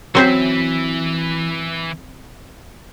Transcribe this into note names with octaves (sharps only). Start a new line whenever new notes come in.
E3 F#3 C4 C5 E5